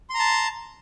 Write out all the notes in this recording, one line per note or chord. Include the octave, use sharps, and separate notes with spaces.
A5 A#5 C6